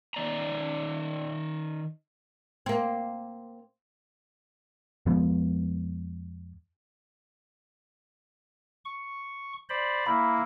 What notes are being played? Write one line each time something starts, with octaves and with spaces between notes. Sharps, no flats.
D#3 D5 A#5
A#3 C4
F2 F3 G#3 B3
C#6
C5 D5 B5
A#3 E4 B5